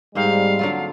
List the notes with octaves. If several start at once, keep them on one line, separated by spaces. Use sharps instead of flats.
G#2 G3 A#3 C4 A#4 F5
D3 F#3 F4